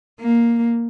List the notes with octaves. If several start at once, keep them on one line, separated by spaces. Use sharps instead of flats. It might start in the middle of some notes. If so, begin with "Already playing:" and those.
A#3